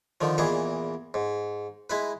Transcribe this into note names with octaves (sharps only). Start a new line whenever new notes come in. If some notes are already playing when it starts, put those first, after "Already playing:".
D3 D#3 F3
E2 A#2 E3 G#4 D#5
G#2
G#3 E4 B4